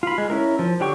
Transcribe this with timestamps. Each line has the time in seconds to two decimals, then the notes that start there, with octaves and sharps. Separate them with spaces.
0.03 F4 B5
0.18 G#3
0.30 C#4 E4 A#4
0.59 F3
0.80 D3 F#3 G4 G5 C#6